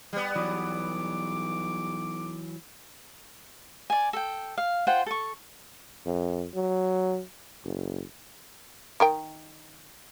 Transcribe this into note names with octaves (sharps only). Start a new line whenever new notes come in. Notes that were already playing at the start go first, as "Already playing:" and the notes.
G3 B3
B1 E3 F#3 D6
D5 G#5
A4 G5
F5
F4 C5 F#5 G5
A4 C#6
F2
F#3
F#1
D#3 A#4 G5